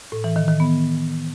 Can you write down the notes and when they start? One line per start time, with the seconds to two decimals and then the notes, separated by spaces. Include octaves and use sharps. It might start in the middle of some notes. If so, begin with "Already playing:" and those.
0.12 A2
0.24 E3
0.36 D#3
0.48 D#3
0.60 B3